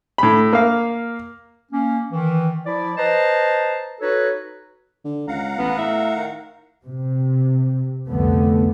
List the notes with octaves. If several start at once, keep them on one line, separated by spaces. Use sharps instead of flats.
A2 B5
A#3 F5
A#3 C#4
D#3 E3
F3 E4 D5
B4 C5 D#5 A5 A#5
D#4 F#4 A4 B4 C#5
D3
C#2 F5 F#5 A#5
A1 B3
A2 E5
D#3
C3
C2 F2 D3 A3 B3